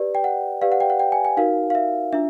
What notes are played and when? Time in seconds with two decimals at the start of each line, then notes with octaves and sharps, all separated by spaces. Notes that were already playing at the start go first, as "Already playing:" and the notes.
Already playing: G4 B4 D5
0.15 G5
0.24 F#5
0.61 G4 B4 D5 F5
0.72 F#5
0.80 G5
0.90 F#5
0.99 G5
1.12 G#5
1.25 G#5
1.37 D#4 F#4 A#4 F5
1.70 F5
1.75 E5
2.13 D4 F4 E5